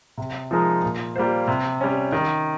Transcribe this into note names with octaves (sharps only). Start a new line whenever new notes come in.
C3
F3 G#3 D#4 A#4
A#2
G3 A#3 F4 C5
C3
G3 C#4
D#3